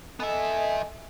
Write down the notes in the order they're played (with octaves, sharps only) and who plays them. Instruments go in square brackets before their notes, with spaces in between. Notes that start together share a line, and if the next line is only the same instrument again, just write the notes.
[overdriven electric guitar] B3 E5 [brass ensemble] A4 D#5 G#5